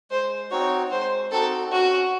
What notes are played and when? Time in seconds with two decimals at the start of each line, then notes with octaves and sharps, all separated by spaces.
0.11 G#3 C5
0.51 C4 D#4 F#4 C#5
0.91 G#3 C5
1.32 C4 D#4 F#4 A4
1.72 C#4 F#4